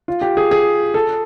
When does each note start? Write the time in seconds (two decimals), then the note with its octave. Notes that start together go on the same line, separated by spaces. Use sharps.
0.08 F4
0.22 G4
0.37 G#4
0.51 G#4
0.94 A4